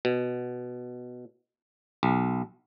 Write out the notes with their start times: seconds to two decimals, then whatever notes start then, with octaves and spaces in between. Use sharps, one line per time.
0.05 B2
2.03 B1